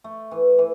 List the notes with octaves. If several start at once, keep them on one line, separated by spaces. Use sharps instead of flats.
A3
E3
E3